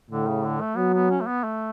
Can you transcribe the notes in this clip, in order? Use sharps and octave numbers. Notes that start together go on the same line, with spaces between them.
A2 D3
C#3
D3
A3
F#3 B3
B3
C#4
A3
B3
A3